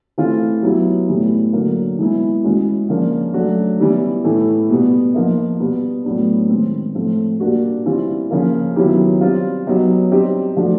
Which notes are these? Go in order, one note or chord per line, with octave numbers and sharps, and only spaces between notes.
E3 A3 C4 F4
F#3 B3 E4 G4
A2 E3 G3 B3
D3 F#3 A#3
E3 G#3 B3 E4
E3 G#3 C#4 F#4
C#3 F3 A#3 D4
F#3 A3 D4 F#4
E3 G3 B3 E4 G4
A2 E3 A3
B2 G3 B3
F3 A#3 D#4
B2 G3 B3
A2 F#3 B3 D4
D#3 G#3 C4
A2 F3 A3 C4
A#2 G3 A#3 D4 F#4
E3 G3 C4 F4
C#3 F3 A#3
D#3 F#3 B3 E4 G4
G3 C4 F4
F#3 B3 D#4 G4
G3 C4 D#4 G4
F3 A3 D4 F#4